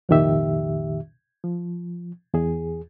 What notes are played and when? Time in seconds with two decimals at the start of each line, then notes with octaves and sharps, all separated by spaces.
0.09 C2 F2 A#2 D#3 G4 E5
1.44 F3
2.34 E2 G#4